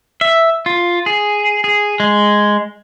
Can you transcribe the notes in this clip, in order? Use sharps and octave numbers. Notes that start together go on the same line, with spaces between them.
E5
F4
G#4
G#4
G#3